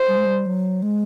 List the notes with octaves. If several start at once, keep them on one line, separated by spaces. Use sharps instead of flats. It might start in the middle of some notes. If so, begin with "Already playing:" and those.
Already playing: C5
G3
G#3
G3
F#3
G#3